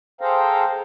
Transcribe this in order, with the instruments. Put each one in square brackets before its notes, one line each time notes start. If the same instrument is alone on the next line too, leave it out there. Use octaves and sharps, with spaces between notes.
[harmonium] G#4 A4 C5 F5 G5 A#5